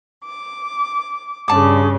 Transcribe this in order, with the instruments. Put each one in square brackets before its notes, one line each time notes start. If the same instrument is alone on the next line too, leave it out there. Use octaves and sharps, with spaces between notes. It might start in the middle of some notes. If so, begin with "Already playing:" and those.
[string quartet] D6
[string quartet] G2 C#3 [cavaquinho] D5 A5 D6